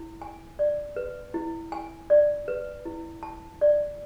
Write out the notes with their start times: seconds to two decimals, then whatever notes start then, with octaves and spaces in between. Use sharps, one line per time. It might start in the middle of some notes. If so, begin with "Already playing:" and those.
Already playing: E4
0.22 G#5
0.59 D5
0.96 B4
1.34 E4
1.72 G#5
2.10 D5
2.48 B4
2.85 E4
3.23 A5
3.61 D5